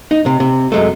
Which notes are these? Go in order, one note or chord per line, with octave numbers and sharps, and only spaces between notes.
D#4
C3
C3
F#2 G#3 A3